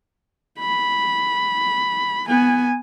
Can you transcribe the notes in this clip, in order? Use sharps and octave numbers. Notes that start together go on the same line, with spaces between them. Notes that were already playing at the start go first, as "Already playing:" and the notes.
B5
B3 G#5